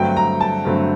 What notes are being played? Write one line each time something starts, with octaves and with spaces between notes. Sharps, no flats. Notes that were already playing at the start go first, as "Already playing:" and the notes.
Already playing: G2 D3 F#3 A3 C4 G5
A#5
A5
G2 D3 F#3 A3 C4